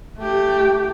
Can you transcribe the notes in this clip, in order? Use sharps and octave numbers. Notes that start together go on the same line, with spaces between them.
A3 G4